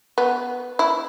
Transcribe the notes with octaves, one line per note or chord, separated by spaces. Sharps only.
B3
E4